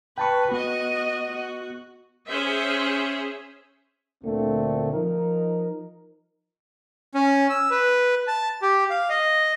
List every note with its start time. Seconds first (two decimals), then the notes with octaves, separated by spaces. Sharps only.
0.18 B4 G5 A5 C#6
0.52 B3 F#4 D#5
1.33 F#4
2.28 C#4 G#4 C5 E5
4.24 D2 A#2 D3 A3 A#3 C4
4.92 F3 D#4 A#4
7.15 C#4
7.50 E6
7.71 B4
8.27 A5
8.62 G4
8.90 F5
9.09 D#5